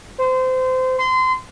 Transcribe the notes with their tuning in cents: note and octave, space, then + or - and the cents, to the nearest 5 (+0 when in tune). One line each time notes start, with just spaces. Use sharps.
C5 -25
C6 -25